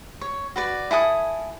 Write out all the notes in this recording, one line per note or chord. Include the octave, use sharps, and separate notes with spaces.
C#5
F#4 B4 D5
E4 A4 G#5 D#6